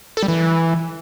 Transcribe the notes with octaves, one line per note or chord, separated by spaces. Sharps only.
A4
G3
E3